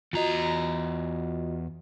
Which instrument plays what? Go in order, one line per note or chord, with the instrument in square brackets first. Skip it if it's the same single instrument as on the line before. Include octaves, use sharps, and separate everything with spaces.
[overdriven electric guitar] E2 A#5 [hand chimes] F4 F#4 D#5